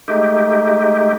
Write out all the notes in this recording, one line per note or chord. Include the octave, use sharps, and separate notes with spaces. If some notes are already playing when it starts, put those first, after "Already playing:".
G#3 A3 D#4 G4